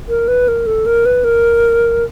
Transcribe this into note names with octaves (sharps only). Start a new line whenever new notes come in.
A#4
B4
A#4
A4
A#4
B4
A#4